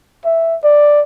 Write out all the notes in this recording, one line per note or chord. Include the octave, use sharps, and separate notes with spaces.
E5
D5